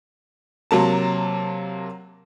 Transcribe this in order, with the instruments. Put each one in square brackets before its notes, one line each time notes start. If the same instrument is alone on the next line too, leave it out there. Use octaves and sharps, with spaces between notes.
[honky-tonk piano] C3 F#3 A#3 A5